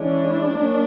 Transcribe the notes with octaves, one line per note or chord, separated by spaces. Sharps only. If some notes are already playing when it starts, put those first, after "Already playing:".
Already playing: E3 G#3 C#4 D4
F#3 A#3 C#4